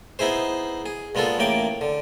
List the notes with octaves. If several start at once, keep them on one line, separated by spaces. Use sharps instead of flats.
B3 D#4 E4 G#4 C5
G#4
A#2 G#3 B3 F4 A4
A1 A2 A#3 G5 D6
D3